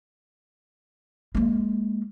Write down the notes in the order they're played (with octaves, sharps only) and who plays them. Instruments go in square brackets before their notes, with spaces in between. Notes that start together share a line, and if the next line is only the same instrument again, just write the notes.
[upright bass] G#3 A#3